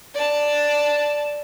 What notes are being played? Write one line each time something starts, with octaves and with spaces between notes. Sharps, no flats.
D5 A5